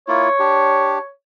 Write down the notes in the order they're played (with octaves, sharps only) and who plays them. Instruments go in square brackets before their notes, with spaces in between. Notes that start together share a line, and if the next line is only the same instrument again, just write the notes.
[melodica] A#3 E4 F4 [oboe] C#5
[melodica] D4 G4